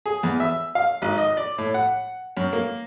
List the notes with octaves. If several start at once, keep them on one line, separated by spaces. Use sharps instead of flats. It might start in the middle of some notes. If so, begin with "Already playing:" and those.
G#4
E2
E5
F5
G#1
D#5
D5
A2
F#5
F#2
A#3